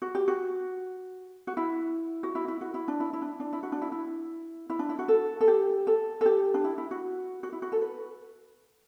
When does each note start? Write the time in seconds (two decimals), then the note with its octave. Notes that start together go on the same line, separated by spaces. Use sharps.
0.02 F#4
0.15 G4
0.28 F#4
1.47 F#4
1.57 E4
2.23 F#4
2.35 E4
2.48 E4
2.61 F#4
2.74 E4
2.88 D4
3.00 E4
3.13 E4
3.22 D4
3.40 D4
3.53 E4
3.63 F#4
3.72 D4
3.82 E4
3.92 E4
4.70 E4
4.79 D4
4.89 E4
4.99 F#4
5.08 A4
5.41 A4
5.48 G4
5.87 A4
6.21 A4
6.26 G4
6.54 D4
6.64 E4
6.78 E4
6.91 F#4
7.43 F#4
7.52 E4
7.62 F#4
7.72 A4
7.81 B4